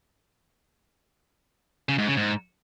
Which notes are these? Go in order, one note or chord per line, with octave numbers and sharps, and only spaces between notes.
C#3
G#2
C#3
G#2